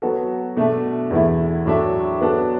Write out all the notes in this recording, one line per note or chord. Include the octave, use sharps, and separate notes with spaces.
F#3 B3 F#4 A4
B2 A3 D4 A4 E5
E2 E3 A3 E4
A2 F#3 D4 A4 E5
F#3 B3 D4 A4